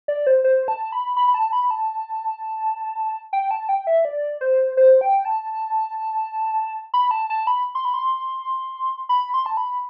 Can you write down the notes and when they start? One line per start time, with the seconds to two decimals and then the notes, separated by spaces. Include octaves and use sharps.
0.08 D5
0.27 C5
0.44 C5
0.68 A5
0.92 B5
1.17 B5
1.28 B5
1.34 A5
1.53 B5
1.71 A5
3.33 G5
3.51 A5
3.69 G5
3.87 E5
4.05 D5
4.41 C5
4.77 C5
5.01 G5
5.25 A5
6.94 B5
7.11 A5
7.30 A5
7.47 B5
7.75 C6
7.85 B5
7.94 C6
9.09 B5
9.34 C6
9.46 A5
9.57 B5